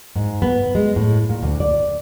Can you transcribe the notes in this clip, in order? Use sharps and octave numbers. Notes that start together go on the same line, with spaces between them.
G#2
B3
G#3
A2
A#2
D2
D5